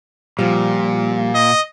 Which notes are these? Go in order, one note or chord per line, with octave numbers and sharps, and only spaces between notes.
A#2 F3 G3
D#5